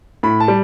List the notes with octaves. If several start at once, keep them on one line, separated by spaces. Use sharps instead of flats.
A2 B5
A5
G3